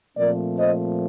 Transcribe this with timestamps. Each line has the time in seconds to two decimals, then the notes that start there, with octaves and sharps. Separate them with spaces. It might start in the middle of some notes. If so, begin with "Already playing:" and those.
0.16 A#2 F3 A3 C4 A#4 D5
0.57 C5 D#5